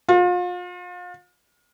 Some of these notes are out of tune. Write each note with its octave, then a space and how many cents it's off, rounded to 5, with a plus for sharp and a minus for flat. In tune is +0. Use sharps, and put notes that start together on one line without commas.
F4 +35